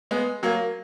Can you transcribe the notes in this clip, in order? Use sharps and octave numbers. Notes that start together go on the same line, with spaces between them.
G#3 B3
F#3 A#3